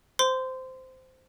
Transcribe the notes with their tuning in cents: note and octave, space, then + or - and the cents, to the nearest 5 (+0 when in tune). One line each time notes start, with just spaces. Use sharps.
C5 -15 C6 -25